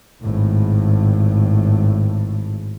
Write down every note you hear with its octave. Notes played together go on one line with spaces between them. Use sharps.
G#1 A2